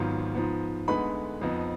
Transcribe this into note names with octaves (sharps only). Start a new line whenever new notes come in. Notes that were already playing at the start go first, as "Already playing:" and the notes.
Already playing: G#1 G#2 F#3 B3 F4
G#2 F3 B3
D2 D3 G#3 B3 D#4 B4 B5
F2 F3 B3 D#4